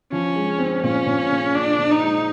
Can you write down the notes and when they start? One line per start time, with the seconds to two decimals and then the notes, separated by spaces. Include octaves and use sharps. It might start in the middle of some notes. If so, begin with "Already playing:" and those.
0.12 F3 C#4
0.36 G#3
0.59 C4
0.82 A#2 C#4
1.06 A#2
1.31 A#2
1.54 A#2 D4
1.78 A#2
1.91 D#4
2.02 G#3